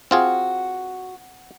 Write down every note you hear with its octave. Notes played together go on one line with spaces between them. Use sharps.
C4 F4 F#4 G#4